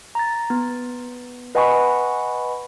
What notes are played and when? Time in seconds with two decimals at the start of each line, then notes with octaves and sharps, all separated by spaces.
0.15 A#5 A6
0.50 B3
1.55 B4 D#5 F#5 G#5 B5 C#6